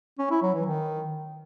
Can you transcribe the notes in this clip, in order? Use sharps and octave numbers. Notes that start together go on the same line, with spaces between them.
C#4
E4
F#3
E3
D#3